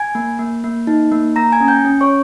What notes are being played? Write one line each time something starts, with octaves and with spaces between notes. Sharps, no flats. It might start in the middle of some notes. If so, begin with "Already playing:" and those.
Already playing: G#5 G#6
A#3
A#3
A#3
D#4
A#3
A#3 A#5 A#6
G#5 G#6
C#4
G5 G6
C#4
C#5 C#6